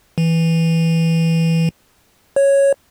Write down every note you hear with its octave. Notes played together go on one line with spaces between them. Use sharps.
E3
C#5